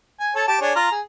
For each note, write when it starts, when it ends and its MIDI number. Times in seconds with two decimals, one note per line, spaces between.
0.20 0.34 80
0.35 0.45 69
0.35 0.45 73
0.35 0.45 81
0.47 0.58 67
0.47 0.58 81
0.61 0.74 62
0.61 0.74 68
0.61 0.74 73
0.76 0.91 65
0.76 0.91 82
0.91 1.00 68